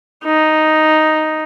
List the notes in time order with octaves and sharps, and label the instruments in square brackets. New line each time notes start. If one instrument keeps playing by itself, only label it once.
[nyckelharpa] D#4